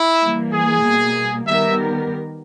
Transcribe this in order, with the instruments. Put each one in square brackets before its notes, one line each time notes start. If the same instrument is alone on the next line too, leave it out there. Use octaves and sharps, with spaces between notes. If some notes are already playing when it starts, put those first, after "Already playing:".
Already playing: [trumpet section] E4
[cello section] E3 G3 A#3
[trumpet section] G#4
[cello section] B2 G3 A#3
[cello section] D#3 G3 B3 G4 A#4 [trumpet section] E5